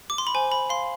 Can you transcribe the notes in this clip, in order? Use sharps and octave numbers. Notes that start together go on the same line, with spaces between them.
D6
C6
B5
C5 G#5
B5
F5 C6